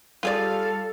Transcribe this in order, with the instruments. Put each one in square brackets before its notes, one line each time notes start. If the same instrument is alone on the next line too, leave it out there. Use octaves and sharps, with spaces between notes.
[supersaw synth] G3 F5 [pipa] F4 G#4 D5 [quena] A4